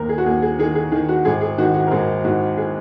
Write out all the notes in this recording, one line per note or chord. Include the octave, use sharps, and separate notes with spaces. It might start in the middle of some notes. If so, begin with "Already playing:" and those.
Already playing: D#2 D#3 A#4
G#4
F#4
D#2 G#4
G#4
D#3 G#4
G#4
D#3 G#4
F#4
G#1 G#4
G#4
D#3 F#4
F#4
A#4
G#1 G#4
G#2 F#4
G#4